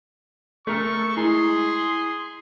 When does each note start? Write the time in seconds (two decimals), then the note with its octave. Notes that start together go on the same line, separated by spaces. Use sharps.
0.67 A3 A4 A#4 C#6 F6
1.17 G#3 E4 G#4 A#5 C6